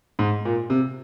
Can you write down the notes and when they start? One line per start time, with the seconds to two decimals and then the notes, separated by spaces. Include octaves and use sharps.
0.19 G#2
0.45 A#2
0.70 C3